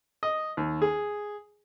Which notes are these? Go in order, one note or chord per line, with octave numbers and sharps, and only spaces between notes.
D#5
D#2
G#4